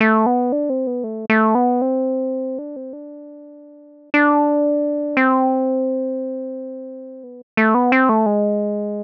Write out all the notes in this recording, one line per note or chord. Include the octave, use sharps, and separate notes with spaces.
A3
B3
D4
C4
B3
A3
A3
B3
C4
D4
C4
D4
D4
C4
B3
A3
B3
C4
A3
G#3